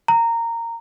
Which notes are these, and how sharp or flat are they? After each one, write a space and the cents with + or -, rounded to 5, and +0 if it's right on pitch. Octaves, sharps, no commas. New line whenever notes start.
A#5 -15